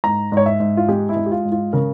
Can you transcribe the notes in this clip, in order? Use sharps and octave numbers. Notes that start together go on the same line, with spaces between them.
G#2 A#5
G#2
C#5
E5
G#2
F4
G#3 G4
E4
G#3
G4
F4
G#2
F4
C#3 A#4